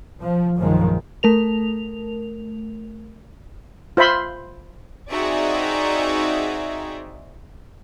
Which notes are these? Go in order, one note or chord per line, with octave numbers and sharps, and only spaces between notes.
F3
A#1 F#2 D#3 F3 G#3
A3 A#4 F7
F4 C5 E5 B5 C6
C4 D#4 F#4 G#4 D5 E5